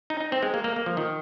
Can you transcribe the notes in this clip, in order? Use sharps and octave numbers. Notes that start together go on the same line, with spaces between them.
D#4
D#4
C4
G#3
A#3
A#3
A#3
F3
D#3